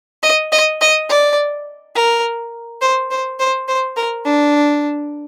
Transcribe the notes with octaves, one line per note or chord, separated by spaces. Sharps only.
D#5
D#5
D#5
D5
A#4
C5
C5
C5
C5
A#4
D4